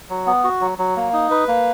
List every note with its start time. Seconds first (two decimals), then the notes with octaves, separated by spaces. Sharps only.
0.09 F#3
0.26 B3
0.44 F#4
0.61 F#3
0.78 F#3
0.97 A#3
1.13 D#4
1.31 B4
1.48 A#3